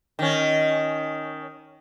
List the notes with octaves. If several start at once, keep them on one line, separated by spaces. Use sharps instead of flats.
D#3 C#4